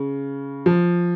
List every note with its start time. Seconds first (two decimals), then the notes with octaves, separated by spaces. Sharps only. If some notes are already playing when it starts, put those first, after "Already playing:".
Already playing: C#3
0.66 F3